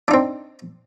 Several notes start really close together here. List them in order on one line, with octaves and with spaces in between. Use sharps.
D4 D#4 C4